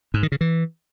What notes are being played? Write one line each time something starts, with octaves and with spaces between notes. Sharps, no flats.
G#2
D#3
C#3
E3